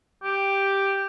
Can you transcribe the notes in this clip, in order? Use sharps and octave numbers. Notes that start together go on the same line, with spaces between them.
G4